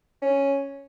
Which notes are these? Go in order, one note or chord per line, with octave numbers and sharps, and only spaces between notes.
C#4